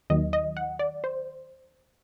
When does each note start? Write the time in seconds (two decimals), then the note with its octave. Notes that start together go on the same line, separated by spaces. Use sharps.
0.10 D#2 D#3 F#3 D#5
0.33 D#5
0.57 F#5
0.79 D5
1.04 C5